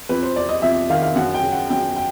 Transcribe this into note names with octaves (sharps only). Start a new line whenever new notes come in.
F2 B4
C5
C3 D5
D#5
F2 E5
D#3 F5
F5
F#2 F#5
G5
C#3
F#5
F#2 G5
G5